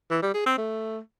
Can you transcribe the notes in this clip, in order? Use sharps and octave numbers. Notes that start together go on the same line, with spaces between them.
E3
G3
G#4
C4
A3